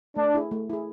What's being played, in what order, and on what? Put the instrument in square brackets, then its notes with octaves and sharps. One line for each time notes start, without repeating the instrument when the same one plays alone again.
[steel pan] A3 [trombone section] D4
[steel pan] E4 G#4
A3
E4 G#4